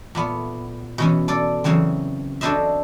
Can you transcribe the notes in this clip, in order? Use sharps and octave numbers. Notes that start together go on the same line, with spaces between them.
A#2 A3 B3
B2 E3 C#4
A4 D5
C#3 E3 F#3 C4
D4 F#4 A4 C5 D#5 E5